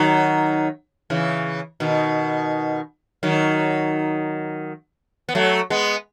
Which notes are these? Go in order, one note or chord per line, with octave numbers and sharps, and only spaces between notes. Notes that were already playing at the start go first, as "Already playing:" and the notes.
Already playing: D#3 F#3
C#3 E3
B2 D#3
D#3 F#3
B3
F#3 A3
G#3 B3